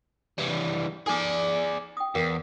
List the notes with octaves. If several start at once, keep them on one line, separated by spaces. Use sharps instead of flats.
E3 G3 C#5 D5
D#4 G#4 A4 D5 G#5
G5 D#6
E2 G#4 A#4 F5